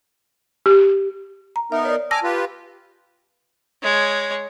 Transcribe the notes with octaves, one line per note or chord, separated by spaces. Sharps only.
G4
A#5
B3 D#4 A#4 E5
C#5 D5
G#5 A5 D6 E6 F6 A#6
F4 G4 B4
G#3 C#5